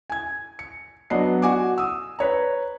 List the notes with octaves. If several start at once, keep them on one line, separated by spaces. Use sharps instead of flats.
G#5 G#6
C#7
F#3 B3 D4 D#5 C7
F#4 G#5 D6
D#6 E6
B4 C#5 A#5